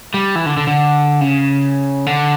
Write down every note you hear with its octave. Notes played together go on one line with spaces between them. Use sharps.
G3
E3
D3
D3
D3
C#3
D3